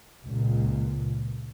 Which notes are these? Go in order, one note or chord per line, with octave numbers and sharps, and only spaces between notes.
C#2 A#2